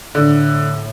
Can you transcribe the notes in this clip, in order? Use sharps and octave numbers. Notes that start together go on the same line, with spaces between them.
A2 D3